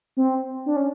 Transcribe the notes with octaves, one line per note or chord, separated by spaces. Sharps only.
C4
D4
C#4